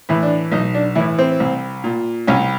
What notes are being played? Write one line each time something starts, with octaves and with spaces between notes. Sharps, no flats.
A2 E3
D4
B1 D#4
D4
A2 E3 E4
C4
C2
A#2
C2 C#4